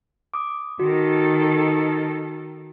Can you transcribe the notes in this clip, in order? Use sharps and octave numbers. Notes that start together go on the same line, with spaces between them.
D6 D#6
D#3 F#4 A4